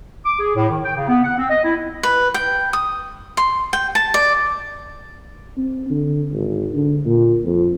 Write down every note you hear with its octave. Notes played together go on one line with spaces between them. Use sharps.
D6
G#4
A2
D#3
G5
C#3
B3
F#5
C4
D#5
E4
B4
G5
D#6
C6
G5
A5
D5
C4
D3
G#1
D3
A#2
F2